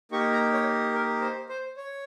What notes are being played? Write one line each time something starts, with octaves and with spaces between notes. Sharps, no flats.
A#3 D#4 G4 C#6
A#5
C#5
A#4
C5
C5
C#5